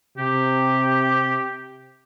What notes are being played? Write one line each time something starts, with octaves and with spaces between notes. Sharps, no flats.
C3 G4